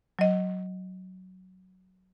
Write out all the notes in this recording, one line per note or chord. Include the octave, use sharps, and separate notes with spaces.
F#3 D#5